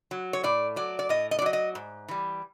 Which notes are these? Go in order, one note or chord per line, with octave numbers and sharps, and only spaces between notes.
F#3
C#5
A2 D5
F#3 D5
D5
A2 D#5
D#5
D5
F#3 D#5
D#5
G#2
E3 G3